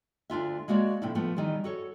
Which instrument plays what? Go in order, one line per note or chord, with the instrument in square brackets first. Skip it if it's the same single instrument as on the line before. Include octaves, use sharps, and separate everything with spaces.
[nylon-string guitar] D2 D4 F4 E5
G#3 A#3 F#4 C#5 D5
A2 C3 F3 D4 E4
F3 A3 B3
D#3 E3 G3
F#4 A4 C#5